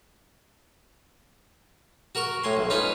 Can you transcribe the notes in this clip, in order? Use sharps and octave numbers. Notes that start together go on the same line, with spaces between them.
F#4 A#4 A#5 C#6
A2 G#5 C6
B1
C#4 D#4 F4 B4 D#5 G#5